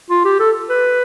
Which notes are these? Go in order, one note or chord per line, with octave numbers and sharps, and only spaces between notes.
F4
G4
A4
B4